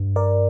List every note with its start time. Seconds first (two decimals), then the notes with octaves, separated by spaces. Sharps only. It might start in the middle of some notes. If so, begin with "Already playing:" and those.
Already playing: G2
0.16 A#4 D5